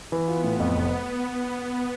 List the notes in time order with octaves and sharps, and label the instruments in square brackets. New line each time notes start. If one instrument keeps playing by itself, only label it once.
[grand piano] E3 [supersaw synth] B3
[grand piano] F4
A2
F2
F1